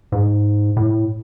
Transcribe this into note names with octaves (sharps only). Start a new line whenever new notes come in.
G#2
A2